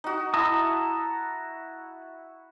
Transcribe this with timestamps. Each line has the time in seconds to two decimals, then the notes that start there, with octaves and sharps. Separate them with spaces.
0.04 D#4 F#4
0.34 E4 A5 A#5 D#6